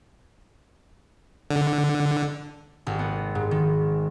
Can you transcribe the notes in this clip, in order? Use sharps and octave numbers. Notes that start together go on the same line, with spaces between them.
D3
G#1
B3
G#2
D#3